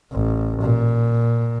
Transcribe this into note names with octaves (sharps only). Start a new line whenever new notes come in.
A1
A#2